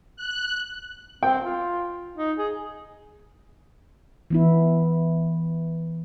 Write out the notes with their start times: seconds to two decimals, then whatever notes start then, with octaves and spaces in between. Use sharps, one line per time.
0.16 F#6
1.23 C4 G5
1.44 F4
2.16 D#4
2.38 G#4
4.30 E3 B3 E4